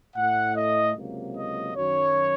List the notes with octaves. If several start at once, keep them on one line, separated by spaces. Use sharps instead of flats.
A2 A3 F#5
D#5
C#2 C3 F#3 A#3
D#5
F#2 D#3 F#3 C#5